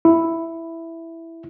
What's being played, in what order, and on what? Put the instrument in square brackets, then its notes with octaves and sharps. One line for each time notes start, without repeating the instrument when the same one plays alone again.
[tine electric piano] E4